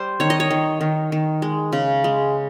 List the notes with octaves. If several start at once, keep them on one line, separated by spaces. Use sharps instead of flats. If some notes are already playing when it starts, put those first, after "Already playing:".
Already playing: G3 C5
D#3 C#5
D#5
C#5
D#3
D#3
D#3
G#3
C#3
G#3